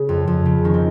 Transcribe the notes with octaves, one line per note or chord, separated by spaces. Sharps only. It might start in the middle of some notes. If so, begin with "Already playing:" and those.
Already playing: C#3 C#4
F2
F2
C#3
D#3 C#4
C4